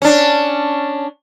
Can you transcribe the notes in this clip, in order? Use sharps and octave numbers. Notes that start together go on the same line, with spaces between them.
C#4 D4